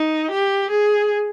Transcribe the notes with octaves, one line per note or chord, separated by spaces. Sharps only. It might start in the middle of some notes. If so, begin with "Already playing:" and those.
Already playing: D#4
G4
G#4